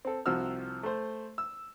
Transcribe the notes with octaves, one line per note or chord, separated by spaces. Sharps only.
C4 A4
C2 C3 F3 F#4 E6 F6
A3 C5
E6